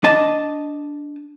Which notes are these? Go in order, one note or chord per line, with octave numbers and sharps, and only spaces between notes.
D4 D#5 A5